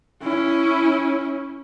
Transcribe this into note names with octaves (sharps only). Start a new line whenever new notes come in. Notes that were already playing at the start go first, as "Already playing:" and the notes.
C#4 E4